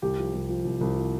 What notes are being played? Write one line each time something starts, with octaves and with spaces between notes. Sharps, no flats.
C2 G4
F3
C2
F3
C2
C2
F3